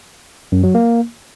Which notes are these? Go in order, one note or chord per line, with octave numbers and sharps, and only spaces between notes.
F#2
F#3
A#3